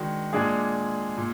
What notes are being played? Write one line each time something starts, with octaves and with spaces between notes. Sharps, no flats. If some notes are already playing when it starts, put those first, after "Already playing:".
Already playing: D#3 G#3 D4 F#4
A#2 G#3 D4 G#4
A#2